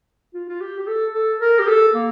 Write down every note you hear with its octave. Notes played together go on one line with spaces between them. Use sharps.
F4
F4
G4
G4
A4
A4
A#4
G4
A4
A#3